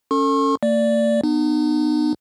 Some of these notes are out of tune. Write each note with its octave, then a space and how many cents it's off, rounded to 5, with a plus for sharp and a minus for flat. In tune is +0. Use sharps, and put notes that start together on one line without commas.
C#4 +0 A4 +30 C#6 -45
A#3 -45 D5 +0
B3 +0 D#4 -40